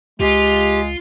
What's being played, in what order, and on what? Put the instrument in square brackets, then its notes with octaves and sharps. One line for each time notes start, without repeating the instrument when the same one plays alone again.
[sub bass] C#2 [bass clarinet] G#3 [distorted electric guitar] F4 [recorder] G4